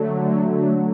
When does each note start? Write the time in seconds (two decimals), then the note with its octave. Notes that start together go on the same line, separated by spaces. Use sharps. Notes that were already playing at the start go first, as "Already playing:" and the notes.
Already playing: D3 F#3 A3
0.15 D3 F#3 A3
0.44 D3 F#3 A3
0.73 D3 F#3 A3